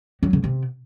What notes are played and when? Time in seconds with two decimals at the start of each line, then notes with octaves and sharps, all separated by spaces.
0.23 F#3
0.33 C#3
0.44 C3